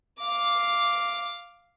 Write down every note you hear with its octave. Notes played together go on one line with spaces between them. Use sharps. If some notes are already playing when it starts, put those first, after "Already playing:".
F5 D6